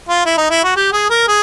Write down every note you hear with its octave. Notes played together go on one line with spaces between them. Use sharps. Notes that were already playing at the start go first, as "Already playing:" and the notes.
F4
E4
D#4
E4
F#4
G4
G#4
A#4
G#4